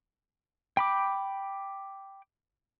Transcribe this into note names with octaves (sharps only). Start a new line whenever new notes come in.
G5 B5 D6